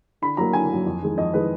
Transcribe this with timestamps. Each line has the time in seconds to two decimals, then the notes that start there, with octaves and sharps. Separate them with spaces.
0.22 D3 B5
0.37 F#3 A#3 A#5
0.53 D3 G#5
0.69 F#3 A#3
0.86 F2
1.02 D#3 G#3
1.17 F2 D#5
1.33 D#3 G#3 B4